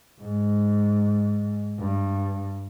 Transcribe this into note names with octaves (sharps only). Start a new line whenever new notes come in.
G#2
G2